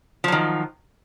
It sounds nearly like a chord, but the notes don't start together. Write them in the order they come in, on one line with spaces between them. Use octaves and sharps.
F3 F#3 D#3